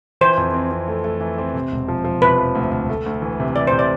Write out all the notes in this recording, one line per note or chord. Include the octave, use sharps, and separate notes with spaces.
E3 C5
F2
C4
C4
A3
A3
E3
C4
C3
E1
F3
F3
C3 B4
F3
D2
D2
A3
D2
E3
C3
E3 D5
C3 C5
D5